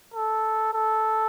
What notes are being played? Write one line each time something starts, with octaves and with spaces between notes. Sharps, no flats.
A4
A4